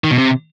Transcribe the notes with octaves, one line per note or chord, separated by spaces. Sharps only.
D#3
B2
C3